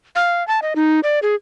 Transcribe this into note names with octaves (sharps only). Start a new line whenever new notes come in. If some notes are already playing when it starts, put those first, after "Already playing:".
F5
A5
D#5
D#4
D5
G#4